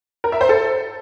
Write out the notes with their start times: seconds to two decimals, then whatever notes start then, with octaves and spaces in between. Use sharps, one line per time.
0.24 A#4
0.32 E5
0.41 C5
0.49 A4